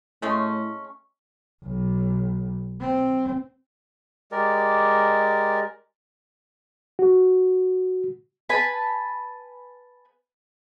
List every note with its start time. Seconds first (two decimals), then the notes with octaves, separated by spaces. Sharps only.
0.22 A2 G#3 A3 C#4
1.64 B1
2.80 C4
4.32 G#3 G4 A#4 D5
6.99 F#4
8.49 B4 G#5 A5 B5